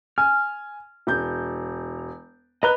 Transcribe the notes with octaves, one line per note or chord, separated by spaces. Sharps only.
G#5 F6
E1 G6
B4 D#5 A#5 F#6 G7